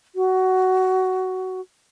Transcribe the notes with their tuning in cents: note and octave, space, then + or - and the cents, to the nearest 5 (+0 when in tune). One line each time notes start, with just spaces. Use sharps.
F#4 +15